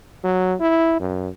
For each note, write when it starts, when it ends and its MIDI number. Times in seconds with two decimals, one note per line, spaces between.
0.24 0.55 54
0.60 1.00 64
1.00 1.29 42